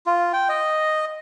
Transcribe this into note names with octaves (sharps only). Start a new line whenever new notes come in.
F4
G5
D#5